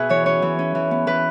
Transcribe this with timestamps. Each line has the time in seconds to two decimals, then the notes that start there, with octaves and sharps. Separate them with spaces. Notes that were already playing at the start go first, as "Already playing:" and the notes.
Already playing: B2 B3 G#4 B4 E5
0.09 E3 C#5
0.26 C#4 C#5
0.42 E3
0.59 C#4
0.75 E3
0.91 B3
1.07 E3 B4